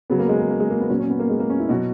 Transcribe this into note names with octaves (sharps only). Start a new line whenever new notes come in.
C#3 F#3 B3
A#3
G#3
A#3
A#3
G#3
A#3
B3
A#2 F#3 C#4
C#4
B3
A#3
G#3
A#3
C#4
E4
B2 F#3 F#4